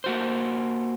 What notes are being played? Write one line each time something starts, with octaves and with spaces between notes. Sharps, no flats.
A#3 F#4 C5